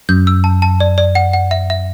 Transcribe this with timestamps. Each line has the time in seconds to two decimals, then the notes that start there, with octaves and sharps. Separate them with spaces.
0.09 F#2 G6
0.27 E6
0.44 A5
0.62 A5
0.80 D5
0.98 D5
1.15 F#5
1.33 F#5
1.51 E5
1.70 E5